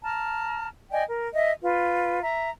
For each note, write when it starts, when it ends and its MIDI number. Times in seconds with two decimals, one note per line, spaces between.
0.04 0.68 81
0.04 0.68 82
0.04 0.68 89
0.91 1.03 74
0.91 1.03 75
0.91 1.03 79
0.91 1.03 80
1.07 1.28 70
1.33 1.52 75
1.33 1.52 76
1.62 2.20 65
1.62 2.20 71
2.22 2.50 76
2.22 2.50 82